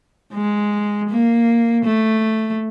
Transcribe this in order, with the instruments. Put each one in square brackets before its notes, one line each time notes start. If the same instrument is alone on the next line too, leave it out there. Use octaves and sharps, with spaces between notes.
[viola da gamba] G#3
A#3
A3